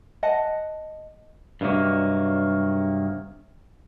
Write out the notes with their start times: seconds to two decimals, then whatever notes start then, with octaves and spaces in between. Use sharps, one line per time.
0.23 D#5 F#5 A5
1.61 G2 C3 D#3 F#3 A#3